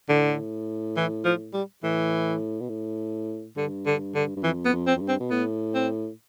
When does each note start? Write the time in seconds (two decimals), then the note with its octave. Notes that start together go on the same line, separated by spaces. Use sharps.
0.09 A2 D3
0.97 E3
1.25 F3
1.53 G3
1.83 A2 E3
2.60 B2
2.69 A2
3.56 G2 D3
3.86 D3
4.15 D3
4.36 G2
4.43 F2 E3
4.65 B3
4.72 F2
4.87 C4
4.96 F2
5.01 G2
5.08 C4
5.20 B2
5.30 A2 B3
5.74 C4